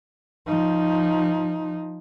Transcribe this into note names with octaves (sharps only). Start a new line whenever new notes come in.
F3 D#4